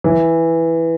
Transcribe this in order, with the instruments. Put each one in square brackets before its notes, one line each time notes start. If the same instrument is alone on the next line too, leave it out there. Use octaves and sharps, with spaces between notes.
[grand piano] E3